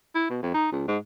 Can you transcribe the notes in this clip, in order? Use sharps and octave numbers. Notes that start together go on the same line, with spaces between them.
E4
B2
F2
D#4
C#2
G#2